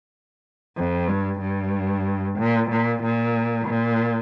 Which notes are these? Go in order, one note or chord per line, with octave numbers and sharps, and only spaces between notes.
F2
G2
G2
A#2
A#2
A#2
A#2